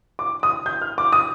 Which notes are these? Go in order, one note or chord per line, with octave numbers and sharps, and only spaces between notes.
D6
D#6
G6
F6
D6
D#6